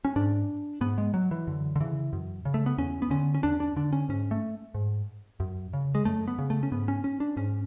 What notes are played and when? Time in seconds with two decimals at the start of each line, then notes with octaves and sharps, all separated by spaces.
0.05 C#4
0.16 G#2 D4
0.81 G#2 B3
0.98 G#3
1.14 F#3
1.31 E3
1.47 F#2 D3
1.76 D3
1.80 C#3 E3
2.13 F#2
2.45 C#3
2.54 A3
2.66 B3
2.78 E2 C#4
3.02 B3
3.11 D3 C#4
3.35 C#4
3.43 E2 D4
3.60 D4
3.76 D3 D4
3.93 C#4
4.09 G#2 C#4
4.31 A3
4.75 G#2
5.40 F#2
5.73 C#3
5.95 G#3
6.05 F#2 A3
6.28 B3
6.39 C#3
6.50 A3
6.63 C#4
6.72 G#2 B3
6.88 C#4
7.04 C#4
7.20 D4
7.36 G#2 C#4